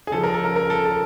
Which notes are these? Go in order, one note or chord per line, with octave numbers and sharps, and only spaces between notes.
G#4
C#3 F3 A4
A#4
A4
A#4
A#4
A4
A4